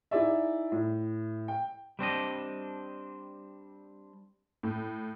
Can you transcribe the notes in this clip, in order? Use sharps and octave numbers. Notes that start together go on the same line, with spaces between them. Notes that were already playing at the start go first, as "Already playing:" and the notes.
D#4 E4 G#4 D5 E5
A2
G5
G3 C4 D4 D#5
A2